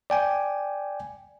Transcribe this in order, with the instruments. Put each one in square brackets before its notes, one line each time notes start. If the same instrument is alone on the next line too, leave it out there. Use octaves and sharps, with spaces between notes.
[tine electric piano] D5 G5 G#5